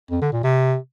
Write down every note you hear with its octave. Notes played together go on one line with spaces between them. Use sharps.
F2
D3
A#2
C3